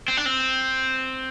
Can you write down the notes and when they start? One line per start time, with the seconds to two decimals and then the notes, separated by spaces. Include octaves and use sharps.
0.08 C4
0.17 D4
0.26 C4